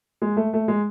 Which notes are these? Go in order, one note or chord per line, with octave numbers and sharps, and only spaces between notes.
G#3
A3
A3
G#3